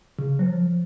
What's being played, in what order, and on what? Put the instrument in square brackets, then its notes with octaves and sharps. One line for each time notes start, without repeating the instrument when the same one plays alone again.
[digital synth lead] C#3
F#3
F3